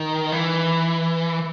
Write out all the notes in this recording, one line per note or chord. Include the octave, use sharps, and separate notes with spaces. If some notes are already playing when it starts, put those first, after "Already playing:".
Already playing: D#3
E3